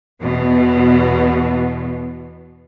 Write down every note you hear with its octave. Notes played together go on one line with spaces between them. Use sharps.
E2 B2